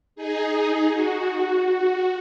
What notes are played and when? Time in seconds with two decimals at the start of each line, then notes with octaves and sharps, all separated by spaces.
0.16 D#4 G#4
0.53 D#4 G#4
0.91 F#4
1.66 F#4